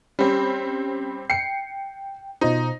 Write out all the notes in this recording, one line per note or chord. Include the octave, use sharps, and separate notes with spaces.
G3 C4 C#4
G5 C7 C#7
B2 D#4 F4 C5